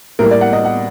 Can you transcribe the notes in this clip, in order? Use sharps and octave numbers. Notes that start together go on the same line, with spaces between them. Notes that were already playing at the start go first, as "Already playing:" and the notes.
A2 G3 A#3 A#4
D5
F#5
D#5
F#5